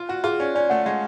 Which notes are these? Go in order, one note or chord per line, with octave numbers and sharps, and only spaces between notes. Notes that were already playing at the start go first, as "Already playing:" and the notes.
Already playing: F4
F#4 F#5
F4 G#4
C#4 D5
C#4 D5
A3 F#5
G#3 F#5